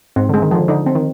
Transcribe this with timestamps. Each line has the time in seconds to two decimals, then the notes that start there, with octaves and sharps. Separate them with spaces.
0.16 G#2 C4
0.29 D3 G#3
0.42 D#3
0.51 D3 F3
0.68 D3 D#4
0.86 C4
0.95 D#3